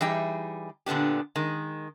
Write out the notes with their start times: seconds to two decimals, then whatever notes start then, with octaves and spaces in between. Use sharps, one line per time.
0.01 E3 G3 D#4 G#4 G5
0.86 A#2 D3 B3 D4 G4
1.36 D#3 G#3